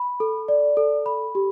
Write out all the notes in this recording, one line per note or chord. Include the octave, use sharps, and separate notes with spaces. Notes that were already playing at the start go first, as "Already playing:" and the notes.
Already playing: B5
A4
D5
A4
B5
G4